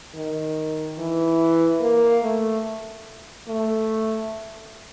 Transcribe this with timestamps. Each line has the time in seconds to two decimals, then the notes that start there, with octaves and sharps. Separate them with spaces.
0.15 D#3
0.98 E3
1.81 A#3
2.23 A3
3.48 A3